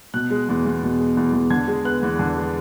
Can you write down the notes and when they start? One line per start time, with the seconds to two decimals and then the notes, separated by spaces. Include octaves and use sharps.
0.14 B2 F#6
0.31 G#3
0.49 E2
0.65 E2
0.83 B2
0.99 G#3
1.17 E2
1.33 E2
1.50 D3 G#6
1.68 G#3
1.85 B3 F#6
2.03 E2
2.19 D3
2.36 G#3